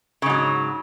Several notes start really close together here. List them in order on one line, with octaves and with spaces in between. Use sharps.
C#3 G#2 F#3